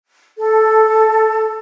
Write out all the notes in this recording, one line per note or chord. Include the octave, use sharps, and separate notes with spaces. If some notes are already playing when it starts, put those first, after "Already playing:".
A4